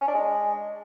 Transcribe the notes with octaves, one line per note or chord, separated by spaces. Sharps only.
C#4
D4
G#3